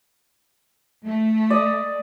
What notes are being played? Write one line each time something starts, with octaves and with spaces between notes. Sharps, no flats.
A3
D5 D#5